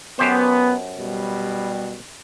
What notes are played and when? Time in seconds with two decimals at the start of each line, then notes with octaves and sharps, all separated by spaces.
0.19 F#2 B3 G4 C5
0.99 B2 G3